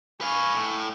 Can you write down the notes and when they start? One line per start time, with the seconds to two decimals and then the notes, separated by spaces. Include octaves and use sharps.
0.21 B4 F5 G#5 C#6
0.54 A2